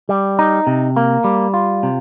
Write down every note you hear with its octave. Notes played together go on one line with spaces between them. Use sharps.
G3
D#4
C3
A#3
G3
F4
C3